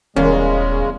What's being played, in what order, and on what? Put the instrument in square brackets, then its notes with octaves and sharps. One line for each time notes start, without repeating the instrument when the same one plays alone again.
[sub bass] D#1 [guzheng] E2 G3 A#3 [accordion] C#3 G#3 [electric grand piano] C#4